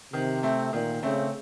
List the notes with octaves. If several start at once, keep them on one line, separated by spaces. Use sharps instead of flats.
C3 D#3
A3 C4
A#2 D#3
C#3 A3 C4